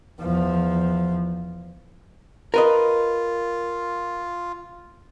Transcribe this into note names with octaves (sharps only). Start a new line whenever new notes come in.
E2 F3
F4 A#4 B4 D#5